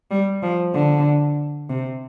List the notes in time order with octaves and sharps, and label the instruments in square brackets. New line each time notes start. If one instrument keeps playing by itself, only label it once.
[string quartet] G3
F3
D3
C3